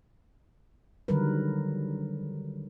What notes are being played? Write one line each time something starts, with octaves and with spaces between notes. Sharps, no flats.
D3 D#3 F#3 G3 A#4 B4